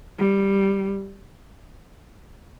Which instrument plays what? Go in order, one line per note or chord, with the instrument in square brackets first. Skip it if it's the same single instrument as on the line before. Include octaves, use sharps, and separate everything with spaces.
[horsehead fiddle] G3